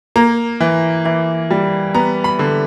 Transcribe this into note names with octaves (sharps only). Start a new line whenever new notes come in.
A#3 A#5
E3
E3
G3
B3 A#5
B5
D3